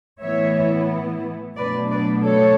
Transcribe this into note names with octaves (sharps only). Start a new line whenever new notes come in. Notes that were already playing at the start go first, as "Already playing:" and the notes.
A2 E3 B3 E4 C#5 E5
B2 F#3 A3 D4 B4 D5
B4 D5
A4 C#5